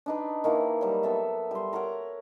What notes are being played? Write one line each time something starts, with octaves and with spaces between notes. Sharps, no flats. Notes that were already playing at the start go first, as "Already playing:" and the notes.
D4 D#4 B4
D#3 E3 A#3
F#3 G3
B3 A4 E5
G3 C6
A#4 C#5 F#5 A#5